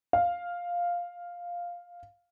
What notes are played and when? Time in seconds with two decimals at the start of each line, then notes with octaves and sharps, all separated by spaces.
0.13 F5